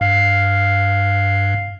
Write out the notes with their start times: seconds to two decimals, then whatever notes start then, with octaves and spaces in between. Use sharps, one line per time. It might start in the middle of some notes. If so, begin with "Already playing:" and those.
0.01 G2 F5